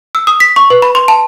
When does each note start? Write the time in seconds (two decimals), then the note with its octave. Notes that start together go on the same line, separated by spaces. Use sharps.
0.15 E6
0.27 D#6
0.40 B6
0.56 C#6
0.70 B4
0.82 B5
0.95 C6
1.08 A5